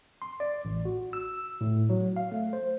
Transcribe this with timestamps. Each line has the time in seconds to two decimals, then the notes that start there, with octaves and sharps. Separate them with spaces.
0.22 C6
0.40 D5
0.65 A1
0.85 F#4
1.13 E6
1.61 A2
1.90 F#3
2.16 F5
2.32 A3
2.53 C5